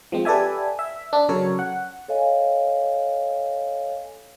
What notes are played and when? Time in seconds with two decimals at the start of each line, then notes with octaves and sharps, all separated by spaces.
0.12 F3 G#3 C4
0.25 G4 A4 B4 D5 E5 G#5
0.79 E5
1.13 D4
1.29 C#3 F#3 A4 A#4 C#5
1.59 F#5
2.08 A4 C#5 D#5 F5 G#5